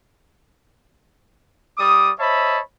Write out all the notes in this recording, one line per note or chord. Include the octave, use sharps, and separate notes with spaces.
G3 D5 D6 D#6
C5 C#5 D#5 E5 A5 B5